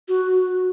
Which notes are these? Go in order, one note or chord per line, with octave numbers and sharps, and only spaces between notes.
F#4